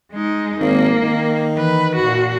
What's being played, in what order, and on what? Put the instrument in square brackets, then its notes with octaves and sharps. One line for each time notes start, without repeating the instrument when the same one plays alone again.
[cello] G#3 D#4
[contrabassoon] G#1 [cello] A#3
[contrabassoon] D#3
[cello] E3 B4
A#2 F#4